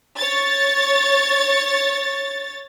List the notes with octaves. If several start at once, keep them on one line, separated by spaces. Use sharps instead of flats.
C#5 A6